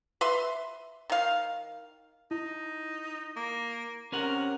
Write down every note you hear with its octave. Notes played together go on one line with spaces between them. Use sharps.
B4 E5 C6
D#3 F5
D#4 E4
A#3
C3 C#4 A#4 F#5